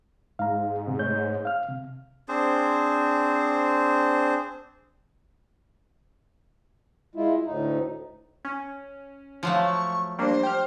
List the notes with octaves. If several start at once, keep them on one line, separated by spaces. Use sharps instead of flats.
G#2 F5 A#5
F2 C3
A3 C#5 G6
F5 F6
C3
C4 D4 G#4 C5
G#3 E4 F4
D2 A2 D#4
C#4
F3 F#3 A3 F5
C#6
G3 A#3 D4 C5
G4 F6